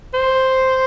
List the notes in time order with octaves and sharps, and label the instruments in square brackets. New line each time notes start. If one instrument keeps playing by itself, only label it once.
[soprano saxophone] C5